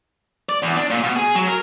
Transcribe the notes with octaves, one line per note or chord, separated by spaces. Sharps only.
D5
E2
D4
A#2
B2
G#4
F#3
A#4